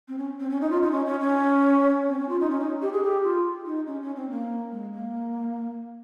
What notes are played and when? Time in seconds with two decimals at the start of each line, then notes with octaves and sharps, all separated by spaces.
0.08 C4
0.18 C#4
0.40 C4
0.50 C#4
0.61 D#4
0.70 F4
0.82 D#4
0.92 C#4
1.06 C#4
1.20 C#4
2.09 C4
2.19 C#4
2.29 F4
2.40 D#4
2.50 C#4
2.60 D#4
2.82 G4
2.93 G#4
3.03 G4
3.24 F4
3.66 D#4
3.87 C#4
4.02 C#4
4.16 C4
4.30 A#3
4.72 G#3
4.93 A#3